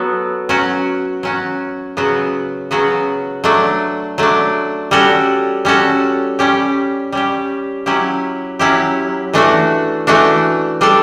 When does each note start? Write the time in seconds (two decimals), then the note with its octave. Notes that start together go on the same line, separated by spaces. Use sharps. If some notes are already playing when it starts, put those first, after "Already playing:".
Already playing: F#3 B3 F#4 A4
0.49 F#3 C#4 F#4
1.23 F#3 C#4 F#4
1.97 C#3 F#3 B3 F#4
2.71 C#3 F#3 B3 F#4
3.44 F#3 A3 D4
4.18 F#3 A3 D4
4.91 G3 C#4 F#4 A4
5.65 G3 C#4 F#4 A4
6.39 G3 C#4 G4
7.12 G3 C#4 G4
7.86 F#3 C#4 E4 G4
8.59 F#3 C#4 E4 G4
9.34 E3 A3 D4 F#4
10.07 E3 A3 D4 F#4
10.81 G3 D4 A4